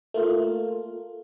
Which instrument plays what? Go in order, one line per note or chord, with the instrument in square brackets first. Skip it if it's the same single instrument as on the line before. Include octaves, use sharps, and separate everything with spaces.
[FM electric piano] A3 A#3 F4